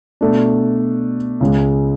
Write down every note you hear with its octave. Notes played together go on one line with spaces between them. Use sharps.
B2 A3 D4
C#2 C#3 G#3